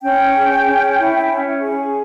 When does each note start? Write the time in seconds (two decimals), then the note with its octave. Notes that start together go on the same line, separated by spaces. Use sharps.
0.03 C#4 G5
0.35 G#4
0.65 C#4
0.97 E4
1.28 C#4
1.59 G#4